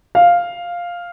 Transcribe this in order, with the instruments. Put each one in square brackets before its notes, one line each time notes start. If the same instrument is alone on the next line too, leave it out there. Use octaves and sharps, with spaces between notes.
[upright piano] F5